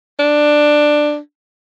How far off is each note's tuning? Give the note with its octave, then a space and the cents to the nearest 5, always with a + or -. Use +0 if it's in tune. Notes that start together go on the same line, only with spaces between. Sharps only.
D4 +10